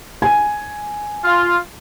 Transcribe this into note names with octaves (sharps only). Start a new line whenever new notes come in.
G#5
F4